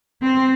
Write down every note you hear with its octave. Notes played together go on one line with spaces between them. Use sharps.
C4